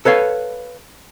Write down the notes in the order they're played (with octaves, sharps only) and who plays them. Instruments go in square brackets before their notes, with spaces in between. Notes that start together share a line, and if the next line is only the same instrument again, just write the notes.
[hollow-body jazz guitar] A4 B4 C#5 F5